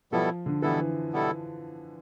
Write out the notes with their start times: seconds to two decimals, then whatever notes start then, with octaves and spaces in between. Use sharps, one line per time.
0.12 B2 F3 G3 B3 E4 A4
0.46 D3
0.62 B2 E3 G3 B3 E4 A4
1.13 B2 G3 B3 E4 A4